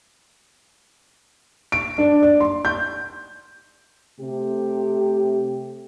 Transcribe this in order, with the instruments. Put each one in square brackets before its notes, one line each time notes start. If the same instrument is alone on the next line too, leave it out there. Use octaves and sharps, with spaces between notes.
[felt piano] D7
D4
D5
C6
G6
[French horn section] C3 A3 G4